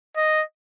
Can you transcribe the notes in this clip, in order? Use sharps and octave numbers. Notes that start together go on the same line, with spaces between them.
D#5